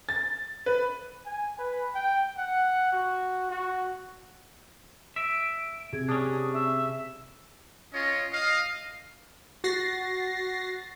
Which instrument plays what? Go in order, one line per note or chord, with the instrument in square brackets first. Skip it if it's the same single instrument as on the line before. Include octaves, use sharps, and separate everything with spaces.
[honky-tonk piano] A6
B4
[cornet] G#5
B4
G5
F#5
F#4
F#4
[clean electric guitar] E5 [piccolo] D7
[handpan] C3 G#4 [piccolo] G#6
[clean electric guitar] C#4 D4 [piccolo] D#6
[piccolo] E5
[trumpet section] C#4 F4 C#5 D#5
D#5 F5
[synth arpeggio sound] F#4 A6 A#6 C7